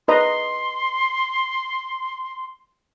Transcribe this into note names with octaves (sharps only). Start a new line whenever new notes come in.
B4 D#5 A#5 C6